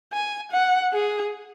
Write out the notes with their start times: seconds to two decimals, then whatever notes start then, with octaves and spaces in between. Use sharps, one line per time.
0.13 G#5
0.52 F#5
0.93 G#4